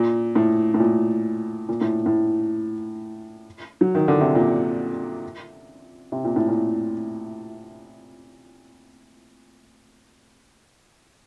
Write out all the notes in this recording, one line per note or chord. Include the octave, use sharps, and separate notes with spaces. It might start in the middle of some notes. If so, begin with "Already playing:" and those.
Already playing: A#2
A2
A2
A#2
A#2
A2
A2
F#3
D#3
D3
C3
A#2
C3
A#2
A2
A#2